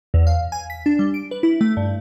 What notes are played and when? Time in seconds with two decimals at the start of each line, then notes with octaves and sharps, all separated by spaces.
0.14 E2
0.27 F5
0.52 G#5
0.70 B6
0.86 D4
0.99 G3
1.14 D7
1.31 B4
1.43 E4
1.61 A3
1.77 G2